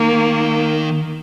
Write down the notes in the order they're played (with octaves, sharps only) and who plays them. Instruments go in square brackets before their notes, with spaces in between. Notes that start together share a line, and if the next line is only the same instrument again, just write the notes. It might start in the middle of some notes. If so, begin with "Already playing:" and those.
Already playing: [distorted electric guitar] D#3 [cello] A#3